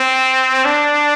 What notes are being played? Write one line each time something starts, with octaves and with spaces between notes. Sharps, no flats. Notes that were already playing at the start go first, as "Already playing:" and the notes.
Already playing: C4
D4